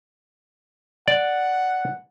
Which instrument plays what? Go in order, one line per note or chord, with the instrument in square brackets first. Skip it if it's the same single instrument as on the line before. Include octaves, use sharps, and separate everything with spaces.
[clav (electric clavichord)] D5 [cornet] F#5